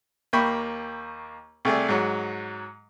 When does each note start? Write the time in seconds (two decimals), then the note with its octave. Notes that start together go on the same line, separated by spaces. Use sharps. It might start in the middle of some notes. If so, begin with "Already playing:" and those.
0.33 D#2 A#3 G5 B5 C#6
1.65 C2 A3 G#4 D5
1.89 G#2 F#3